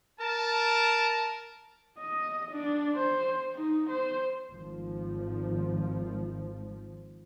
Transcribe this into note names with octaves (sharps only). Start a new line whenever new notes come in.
A#4 A5
D#5
D4
C5
D#4
C5
G#1 F3